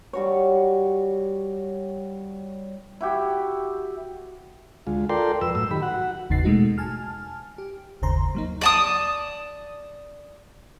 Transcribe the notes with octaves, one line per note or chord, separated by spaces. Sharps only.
G3 F#4 C#5
E4 F#4 G4
D2 G#3 F4
F4 A4 A#4 D5 G5 C6
F2 B4 E6
F#2 A2 E6
D#3 G4 B5
F#4 F#5
G1 E2 C#3 D#4 A6 C7
B2 G#3 A3 D#4 F#4
G#5 A5 F6
G4
G1 D#2 C#3 C5 A#5 C6
F#3 A#3 D#4
D5 A5 D#6